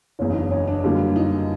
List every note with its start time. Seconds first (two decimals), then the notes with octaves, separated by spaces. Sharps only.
0.19 F#1 E2 C#3 C#4
0.30 D#4
0.36 D4
0.51 C#4
0.68 D4
0.84 F#2 D3 G3 A#3
1.16 D#4